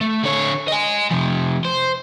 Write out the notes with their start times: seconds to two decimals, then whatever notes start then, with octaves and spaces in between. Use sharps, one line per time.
0.01 A3
0.23 D3 C#5
0.68 D#5 G#5
1.11 C3 F3
1.65 C5